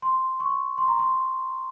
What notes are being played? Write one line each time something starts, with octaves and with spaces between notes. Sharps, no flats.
C6
C#6
C6
A#5
C6